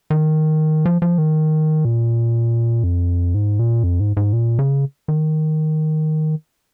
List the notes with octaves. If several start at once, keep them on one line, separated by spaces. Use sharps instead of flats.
D#3
F3
F3
D#3
A#2
F2
G#2
A#2
F2
G#2
G#2
A#2
C#3
D#3